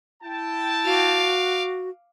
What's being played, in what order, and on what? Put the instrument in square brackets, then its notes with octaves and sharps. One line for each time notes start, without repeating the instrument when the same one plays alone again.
[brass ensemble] E4 G5 A5
[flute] F#4 [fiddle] F5 D6